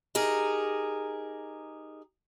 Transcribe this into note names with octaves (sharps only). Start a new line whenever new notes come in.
D#4 G4 G#4 A#4